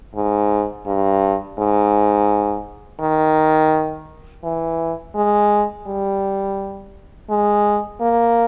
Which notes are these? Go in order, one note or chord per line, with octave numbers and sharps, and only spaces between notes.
G#2
G2
G#2
D#3
E3
G#3
G3
G#3
A#3